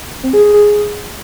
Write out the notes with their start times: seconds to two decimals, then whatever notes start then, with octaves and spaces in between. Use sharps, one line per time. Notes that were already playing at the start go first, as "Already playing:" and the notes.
0.23 C4
0.33 G#4
0.44 G#4
0.54 G#4